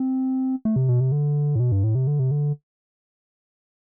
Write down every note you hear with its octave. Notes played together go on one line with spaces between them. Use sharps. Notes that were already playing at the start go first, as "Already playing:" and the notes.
Already playing: C4
A3
C3
B2
C3
D3
A2
B2
G2
A2
C3
D3
C3
D3